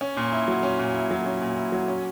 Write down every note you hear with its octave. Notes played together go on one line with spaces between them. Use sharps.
C#4
A#2
E4
F#3
C#4
A#2
E4
F#3
C#4
A#2
E4
F#3
C#4